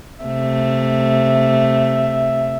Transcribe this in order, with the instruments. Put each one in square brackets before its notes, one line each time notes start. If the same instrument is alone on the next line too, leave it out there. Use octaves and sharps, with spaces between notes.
[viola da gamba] C3 A3 [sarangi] E5